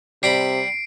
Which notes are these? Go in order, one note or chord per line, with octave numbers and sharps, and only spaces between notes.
C3 G3 A#5 B5 C7 D7